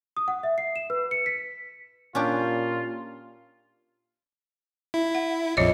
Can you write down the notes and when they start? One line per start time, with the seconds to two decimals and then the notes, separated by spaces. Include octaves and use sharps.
0.17 D#6
0.28 F#5
0.43 E5
0.58 C7
0.76 E7
0.90 B4
1.11 C#7
1.26 B6
2.15 A#2 C#4 D4 F4 G4
4.94 E4
5.15 F#5
5.57 A#1 F2 F4 C#5 D#5